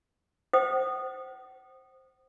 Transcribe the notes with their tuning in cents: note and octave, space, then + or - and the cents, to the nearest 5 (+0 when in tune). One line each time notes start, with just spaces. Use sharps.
C5 +0 F#5 +40 D#6 -20